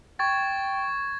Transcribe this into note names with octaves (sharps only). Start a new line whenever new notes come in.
G5 C#6 G#6 A6